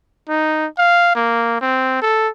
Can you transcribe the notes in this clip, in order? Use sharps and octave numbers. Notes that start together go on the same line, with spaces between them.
D#4
F5
A#3
C4
A4